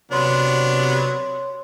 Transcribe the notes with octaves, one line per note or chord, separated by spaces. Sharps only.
C3 F#3 B3 D4 C#5 C6